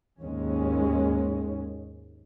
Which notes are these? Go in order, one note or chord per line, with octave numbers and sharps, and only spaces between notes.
D#2 G#2 G#3 C#4